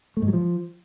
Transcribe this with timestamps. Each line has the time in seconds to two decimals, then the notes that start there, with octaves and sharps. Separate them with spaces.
0.17 A3
0.22 G#2
0.28 F#3
0.33 F3